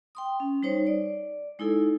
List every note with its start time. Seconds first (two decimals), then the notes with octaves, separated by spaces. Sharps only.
0.15 G5 C6 D#6
0.40 C#4
0.63 G3 D#4 C5 C#5
0.87 D5
1.59 G#3 D#4 E4 A4